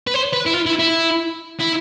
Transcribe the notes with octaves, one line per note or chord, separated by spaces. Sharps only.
B4
C5
B4
E4
F4
E4
E4
E4